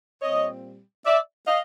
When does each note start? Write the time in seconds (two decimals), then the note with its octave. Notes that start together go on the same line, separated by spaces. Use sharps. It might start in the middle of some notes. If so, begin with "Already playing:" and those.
0.22 A#2 G3 C4 C#5 D#5
1.06 D5 E5
1.47 D#5 F5